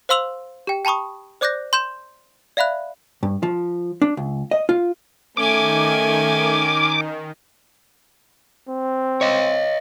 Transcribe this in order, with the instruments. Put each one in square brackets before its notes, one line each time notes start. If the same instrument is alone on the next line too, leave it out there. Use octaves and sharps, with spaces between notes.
[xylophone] C5 F5 C6 E6 F7 F#7
G4 G5
G5 A5 B5 C#6 D#6
C5 D5 D6 F#6 G6 A#6
C6 G6 E7
D5 E5 F5 B5 F#6
[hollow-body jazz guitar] G2
F3
D4
C#2
D#5
F4
[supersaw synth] D#3 [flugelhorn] A3 [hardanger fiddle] C#4 G#5 [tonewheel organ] D6
[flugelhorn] C4
[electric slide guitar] C#5 D#5